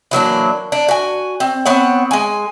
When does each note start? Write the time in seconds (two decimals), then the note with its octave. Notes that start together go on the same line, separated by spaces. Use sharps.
0.11 E3 F#3 A#3 D4
0.72 D4
0.88 F#4 G#5
1.40 C4
1.66 B3 C4 C#5 F#5
2.11 G#3 G#5